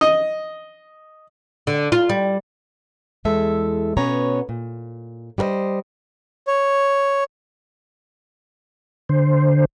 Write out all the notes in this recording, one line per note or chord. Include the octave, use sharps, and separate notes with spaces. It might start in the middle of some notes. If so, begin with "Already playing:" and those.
D#5
D3
F4
G3
E2 G#3 A4 E5
B2 B3 C#4 C#5 A#5
A#2
G3 F#4 A#4 C5 D#5
C#5
D3 C5